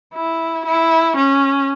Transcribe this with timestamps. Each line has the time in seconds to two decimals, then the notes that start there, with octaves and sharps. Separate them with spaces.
0.14 E4
0.66 E4
1.17 C#4